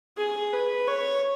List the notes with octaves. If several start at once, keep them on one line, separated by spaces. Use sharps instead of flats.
G#4
B4
C#5